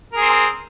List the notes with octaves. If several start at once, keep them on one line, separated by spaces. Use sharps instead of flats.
C4 G#4 A#4